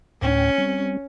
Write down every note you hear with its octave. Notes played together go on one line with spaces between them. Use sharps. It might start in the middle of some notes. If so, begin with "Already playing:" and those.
D2 A2 C#4 G5
G3 C4